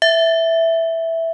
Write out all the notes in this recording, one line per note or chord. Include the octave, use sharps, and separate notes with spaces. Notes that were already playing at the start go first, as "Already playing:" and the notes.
E5